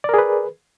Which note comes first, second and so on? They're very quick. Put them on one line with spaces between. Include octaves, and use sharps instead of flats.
D5 A#4 G#4 B4